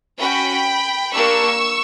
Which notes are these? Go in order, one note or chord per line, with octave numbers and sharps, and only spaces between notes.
C#4 F#4 G5 B5
A#3 D4 G4 C#6 E6